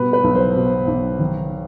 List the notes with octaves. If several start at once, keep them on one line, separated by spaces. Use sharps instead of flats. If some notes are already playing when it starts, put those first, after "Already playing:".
Already playing: B2 G3 B4
B4
B1
C5
B2
B1
D#3